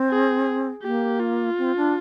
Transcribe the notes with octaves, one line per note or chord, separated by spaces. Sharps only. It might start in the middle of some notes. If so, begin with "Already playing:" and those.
Already playing: C4
G#4
A#3 G4
F4
C4
D4